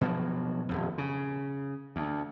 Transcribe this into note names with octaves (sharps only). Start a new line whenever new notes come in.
B2 F3 F#3
D#1 G#1 F2
C#3
D2